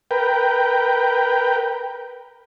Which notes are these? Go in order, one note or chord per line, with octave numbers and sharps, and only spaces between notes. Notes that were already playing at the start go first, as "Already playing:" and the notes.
A#4 B4 G5